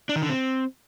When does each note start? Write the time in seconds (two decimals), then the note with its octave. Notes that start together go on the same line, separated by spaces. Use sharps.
0.09 D4
0.16 D#3
0.22 D3
0.29 C4